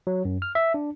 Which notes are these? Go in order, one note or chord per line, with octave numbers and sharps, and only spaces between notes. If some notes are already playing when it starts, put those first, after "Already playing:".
F#3
F#2
F6
E5
D4